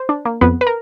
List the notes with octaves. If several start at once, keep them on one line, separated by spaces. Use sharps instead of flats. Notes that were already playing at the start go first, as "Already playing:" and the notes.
Already playing: C5
D4
A#3
F2 B3 B4
B4
A#4